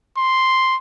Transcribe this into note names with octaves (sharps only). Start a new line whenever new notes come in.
C6